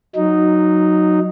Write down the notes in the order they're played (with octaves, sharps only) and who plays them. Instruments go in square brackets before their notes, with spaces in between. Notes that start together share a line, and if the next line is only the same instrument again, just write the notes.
[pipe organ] F#3 D#4